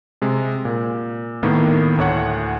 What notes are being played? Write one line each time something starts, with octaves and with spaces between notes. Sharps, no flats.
C3 G#3
A#2
A2 D#3 A#3 B3
D2 A2 C#5 F#5